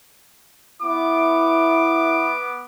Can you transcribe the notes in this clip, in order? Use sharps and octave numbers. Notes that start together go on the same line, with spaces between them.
B3 E4 D6